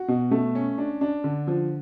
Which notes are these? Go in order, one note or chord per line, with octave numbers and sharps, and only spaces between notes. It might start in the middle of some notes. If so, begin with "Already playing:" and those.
Already playing: F#4
B2
A3
C#4
D4
D4
D3
F3